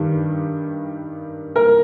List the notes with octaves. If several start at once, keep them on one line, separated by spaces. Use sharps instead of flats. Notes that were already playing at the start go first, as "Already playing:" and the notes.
Already playing: G2 D#3 G3
A#4